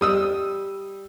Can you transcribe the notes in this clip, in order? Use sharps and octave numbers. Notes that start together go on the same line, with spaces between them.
G3 D#6 E6